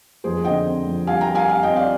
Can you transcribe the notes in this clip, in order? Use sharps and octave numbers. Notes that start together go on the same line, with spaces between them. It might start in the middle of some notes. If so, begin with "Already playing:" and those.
F2 G#4 C5
D3 D#5 G5
C4
F2
G3 F5 G#5
G5 A#5
G3
F5 G#5
G3 F5 G#5
D#5 G5
C4
D5 F5